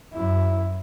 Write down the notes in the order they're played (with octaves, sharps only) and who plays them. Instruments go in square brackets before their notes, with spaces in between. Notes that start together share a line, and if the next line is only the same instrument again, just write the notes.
[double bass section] F#2 [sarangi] E4